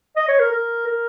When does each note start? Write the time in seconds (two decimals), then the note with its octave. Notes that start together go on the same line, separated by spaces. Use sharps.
0.16 D#5
0.28 C#5
0.39 A#4
0.51 A#4
0.87 A#4